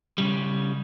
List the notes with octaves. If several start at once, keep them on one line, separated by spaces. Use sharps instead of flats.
C#3 G3